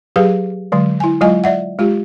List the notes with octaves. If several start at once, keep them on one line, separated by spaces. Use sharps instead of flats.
F#3 G4 G#4 B4 F5
D3 F#3 G#3
E4 G#5
F#3 G#3 F4 D#5 G#5
D5 E5 F#5
G#3 F4 G4